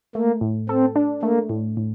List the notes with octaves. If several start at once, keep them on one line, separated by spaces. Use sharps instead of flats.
A3 A#3
A2
C4 A4
D4
A3 A#3
A2
A2